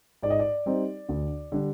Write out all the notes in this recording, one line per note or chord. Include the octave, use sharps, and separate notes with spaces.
G#2 D5
D#5
D5
G3 C4 D#4
D2
D3 G3 D4